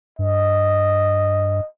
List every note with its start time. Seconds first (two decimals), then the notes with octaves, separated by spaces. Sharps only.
0.19 G2 D#5